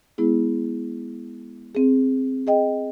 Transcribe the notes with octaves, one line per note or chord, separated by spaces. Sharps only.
G#3 B3 E4 G#4
C4 G#4
G#4 D#5 G5